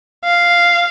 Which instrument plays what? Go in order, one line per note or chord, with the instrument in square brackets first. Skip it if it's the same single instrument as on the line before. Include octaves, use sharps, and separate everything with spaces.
[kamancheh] F5